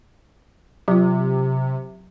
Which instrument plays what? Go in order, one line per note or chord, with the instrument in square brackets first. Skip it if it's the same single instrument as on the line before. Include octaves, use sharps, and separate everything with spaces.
[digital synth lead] C3 [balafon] F#3 F4